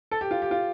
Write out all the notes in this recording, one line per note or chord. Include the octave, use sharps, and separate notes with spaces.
A4
G4
F4
G4
F4